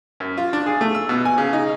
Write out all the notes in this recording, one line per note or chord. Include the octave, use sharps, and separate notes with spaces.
F#2
F4
D4
G#4
A3
E6
B2
G#5
C#3
D#4